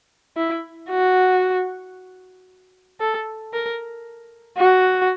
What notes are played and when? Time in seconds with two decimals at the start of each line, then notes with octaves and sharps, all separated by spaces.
0.37 E4
0.90 F#4
3.00 A4
3.53 A#4
4.58 F#4